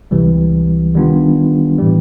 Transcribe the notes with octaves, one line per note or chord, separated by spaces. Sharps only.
C#2 C3 E3 G3
D#3 G3 B3 D4 F4
A2 E3 G3